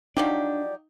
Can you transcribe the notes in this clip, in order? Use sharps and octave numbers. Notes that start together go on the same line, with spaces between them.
F3 F#3 D4 D#4 G4 D5